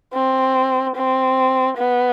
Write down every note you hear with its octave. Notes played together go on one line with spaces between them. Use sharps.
C4
C4
B3